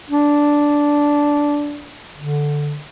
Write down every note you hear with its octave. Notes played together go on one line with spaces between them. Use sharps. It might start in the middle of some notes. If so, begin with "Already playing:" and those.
D4
D3